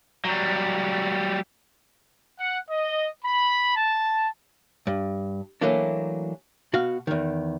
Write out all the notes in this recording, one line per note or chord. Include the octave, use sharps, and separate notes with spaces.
F#3 G3
F#5
D#5
B5
A5
G2
E3 F#3 A3 A#3 D4
B2 F#4 F5
E2 D#3